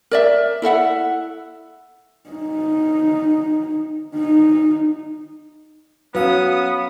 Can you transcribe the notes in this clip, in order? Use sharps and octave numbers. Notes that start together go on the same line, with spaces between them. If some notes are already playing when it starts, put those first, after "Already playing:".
A#4 D5 E5
E4 A4 E5 F#5
D#4
D#4
F#3 B3 C#4 B4 F5 D#6